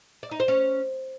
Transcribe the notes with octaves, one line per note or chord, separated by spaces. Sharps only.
D5
D#4
C5
C#4